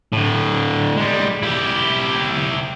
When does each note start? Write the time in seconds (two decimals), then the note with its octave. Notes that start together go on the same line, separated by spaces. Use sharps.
0.13 A2 D3
0.97 G3 G#3
1.43 E4 G4